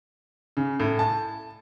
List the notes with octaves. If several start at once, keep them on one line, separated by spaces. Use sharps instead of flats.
C#3
A2
A5